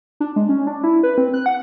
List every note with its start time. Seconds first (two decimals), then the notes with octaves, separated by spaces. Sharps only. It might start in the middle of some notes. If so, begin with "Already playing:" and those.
0.20 D4
0.36 G#3
0.49 C#4
0.67 D4
0.83 E4
1.03 B4
1.18 C4
1.34 F#6
1.46 F#5